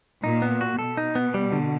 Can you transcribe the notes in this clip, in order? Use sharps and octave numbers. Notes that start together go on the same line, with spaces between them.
A#2 D#4
B3
F#4
B2 A4
D#4
B3
G3
D3